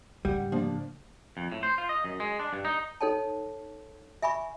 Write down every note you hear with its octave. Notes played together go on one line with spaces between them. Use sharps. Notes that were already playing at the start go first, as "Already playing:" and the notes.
G#2 C#3 G3 F#5
F3 A#3 D4
F2
A2
C5
F4
D#5
F#2
G#3
D4
G2
D#4
D#4 A4 C#5 G5 A5
E5 G#5 B5 C#6